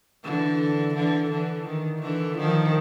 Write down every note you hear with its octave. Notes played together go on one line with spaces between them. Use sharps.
D3 E3
D3 E3
D3 E3
D#3
D3 E3
D#3 F3